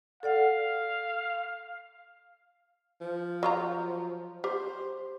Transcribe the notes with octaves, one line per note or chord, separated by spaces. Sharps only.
A4 D5 F5 F#5
F3
F#3 F4 A#5
G4 C5